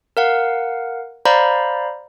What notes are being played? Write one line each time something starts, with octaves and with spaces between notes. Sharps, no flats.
A#4 F5 F#5
C5 D5 F5 A#5 B5